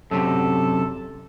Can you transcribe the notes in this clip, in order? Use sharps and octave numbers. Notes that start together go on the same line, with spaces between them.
F#2 C3 A4